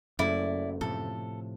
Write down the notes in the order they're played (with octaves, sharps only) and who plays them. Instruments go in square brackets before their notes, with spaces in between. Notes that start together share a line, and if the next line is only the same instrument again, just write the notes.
[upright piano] F#1 A3 [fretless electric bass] F#2 [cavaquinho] E4 D5
[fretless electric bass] A2 C3 F3 [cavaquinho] A4